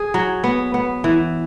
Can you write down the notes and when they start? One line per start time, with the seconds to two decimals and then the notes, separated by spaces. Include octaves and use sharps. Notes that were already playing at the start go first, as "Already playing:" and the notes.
Already playing: G#4
0.14 F#3
0.44 B3
0.74 B3
1.04 E3